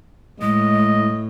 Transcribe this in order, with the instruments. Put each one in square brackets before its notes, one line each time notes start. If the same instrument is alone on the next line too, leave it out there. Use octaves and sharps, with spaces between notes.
[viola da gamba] A2 [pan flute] G#3 [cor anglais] D#5